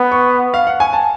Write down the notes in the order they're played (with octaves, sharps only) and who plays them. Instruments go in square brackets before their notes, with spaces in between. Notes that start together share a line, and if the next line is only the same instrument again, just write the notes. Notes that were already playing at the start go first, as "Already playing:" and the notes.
Already playing: [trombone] B3
[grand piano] C#6
F5
F#5
G#5
A5